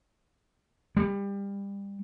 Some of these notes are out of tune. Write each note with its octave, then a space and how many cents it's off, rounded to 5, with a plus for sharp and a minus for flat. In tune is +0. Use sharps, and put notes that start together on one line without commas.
G3 +25